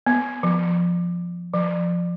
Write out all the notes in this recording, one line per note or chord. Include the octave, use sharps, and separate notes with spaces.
B3
F3
F3